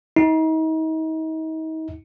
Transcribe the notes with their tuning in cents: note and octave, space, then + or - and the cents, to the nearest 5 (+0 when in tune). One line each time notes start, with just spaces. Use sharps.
D#4 +40